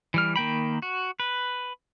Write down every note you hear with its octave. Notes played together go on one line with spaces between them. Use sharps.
E3 G3 F6
D#3 A#3 G5 B5
F#4
B4